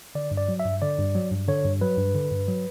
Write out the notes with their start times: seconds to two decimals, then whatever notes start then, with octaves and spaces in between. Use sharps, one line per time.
0.15 D3 D5
0.31 G2
0.37 D5
0.49 F#3
0.60 E5
0.65 G2
0.82 D3 D5
0.98 G2
1.15 F#3
1.31 G2
1.48 D3 C#5
1.65 G2
1.81 F#3 B4
1.98 G2
2.15 D3
2.31 G2
2.48 F#3